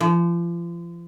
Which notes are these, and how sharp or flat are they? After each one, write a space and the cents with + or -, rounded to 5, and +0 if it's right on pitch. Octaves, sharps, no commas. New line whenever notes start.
F3 -35